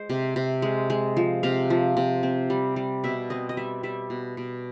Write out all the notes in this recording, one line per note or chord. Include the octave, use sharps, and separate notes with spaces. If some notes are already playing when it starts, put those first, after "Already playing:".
Already playing: G#3 C5
C3
C3
G#3
G#3
F3
C3 F5
F3
C3
C4
G3
G3
B2 E5
C4 D#5
D#5
G3 E5
G3 E5
B2
B2